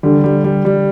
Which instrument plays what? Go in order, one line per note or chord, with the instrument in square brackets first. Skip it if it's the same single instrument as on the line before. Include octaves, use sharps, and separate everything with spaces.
[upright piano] D3 [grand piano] G3
[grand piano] G3
G3
G3